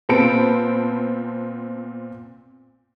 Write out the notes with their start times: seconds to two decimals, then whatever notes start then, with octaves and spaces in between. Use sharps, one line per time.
0.09 A#2 B3 C4 A5 B5 D7